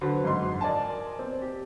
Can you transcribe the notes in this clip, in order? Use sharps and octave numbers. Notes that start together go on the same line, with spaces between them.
D3 F#3 B4 C5
F#1 G#2 F#4 C6
A#4 D5 D#5 G#5 A5
C4
G4